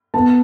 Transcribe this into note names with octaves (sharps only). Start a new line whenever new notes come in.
B3 A5